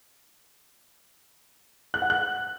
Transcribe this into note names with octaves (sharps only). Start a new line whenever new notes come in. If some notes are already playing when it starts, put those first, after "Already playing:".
F#6
F#5
F#6